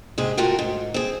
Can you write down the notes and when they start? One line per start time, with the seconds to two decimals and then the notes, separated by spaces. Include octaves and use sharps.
0.18 G#2 C3 G#4
0.37 A3 F4 F#4 A#4 G5
0.59 G#2
0.94 C4 G#4